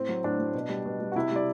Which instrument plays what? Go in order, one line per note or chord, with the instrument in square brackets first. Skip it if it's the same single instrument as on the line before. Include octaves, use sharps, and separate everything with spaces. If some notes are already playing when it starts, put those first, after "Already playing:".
Already playing: [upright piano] A2 C4
F#3
A2 D4
F#3
B2
G3
B2
G3
F#4
C3 E4
G3 D5